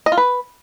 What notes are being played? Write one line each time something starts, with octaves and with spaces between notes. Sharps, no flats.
D#5
F4
B4